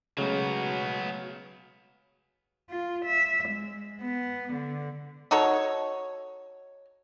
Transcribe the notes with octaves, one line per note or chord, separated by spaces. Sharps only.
C#3 F#3 G#3 A3 B3 F#4
F4
E5
G#3
B3
D3
D#4 F#4 A4 C#5